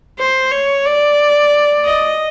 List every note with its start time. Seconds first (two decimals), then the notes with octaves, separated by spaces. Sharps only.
0.19 C5
0.51 C#5
0.85 D5
1.85 D#5